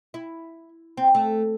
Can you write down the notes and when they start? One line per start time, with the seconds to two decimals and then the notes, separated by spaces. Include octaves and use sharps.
0.14 E4
0.97 C4
1.15 A3